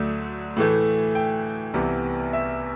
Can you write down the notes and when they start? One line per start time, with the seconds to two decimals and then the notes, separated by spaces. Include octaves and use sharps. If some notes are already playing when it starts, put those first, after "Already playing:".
Already playing: D2 D3 F#3 A3
0.57 A2 E3 A3
1.15 G5
1.74 C2 C3 E3 B3
2.33 E5